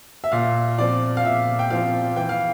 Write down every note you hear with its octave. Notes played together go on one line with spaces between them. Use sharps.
E5
A#2 F5
F3 C4 D5
F5
A#2 E5
G5
F3 C4 F5
E3 G5
F5